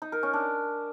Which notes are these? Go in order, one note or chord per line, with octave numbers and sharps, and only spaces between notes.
D#4
A#4
C#4
D4